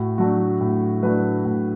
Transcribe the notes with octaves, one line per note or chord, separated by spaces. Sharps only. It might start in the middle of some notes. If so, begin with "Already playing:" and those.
Already playing: A2 F#4
F#3 A3 D4 F#4
A2
F#3 A3 D4 B4
A2